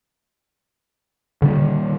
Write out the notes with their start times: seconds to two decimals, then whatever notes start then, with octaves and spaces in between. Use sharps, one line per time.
1.42 A#2 D3 D#3 G3